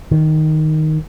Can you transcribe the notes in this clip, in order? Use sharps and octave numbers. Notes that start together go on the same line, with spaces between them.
D#3